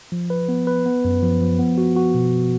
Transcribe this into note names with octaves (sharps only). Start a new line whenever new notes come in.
F3
B4
B3
B4
B3
F#2
F3
F3
B3
F#4
F#4
B2